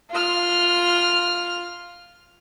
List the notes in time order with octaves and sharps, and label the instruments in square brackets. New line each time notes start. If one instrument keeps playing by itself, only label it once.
[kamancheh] F4 F6